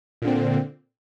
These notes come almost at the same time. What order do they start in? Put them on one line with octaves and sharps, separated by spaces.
A#2 D3 C4